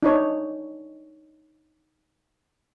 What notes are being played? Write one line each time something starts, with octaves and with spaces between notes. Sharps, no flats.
D4 D#4 C#5